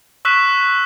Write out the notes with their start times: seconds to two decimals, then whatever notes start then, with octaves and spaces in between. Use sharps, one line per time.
0.25 C#6 E6 F#6 B6 E7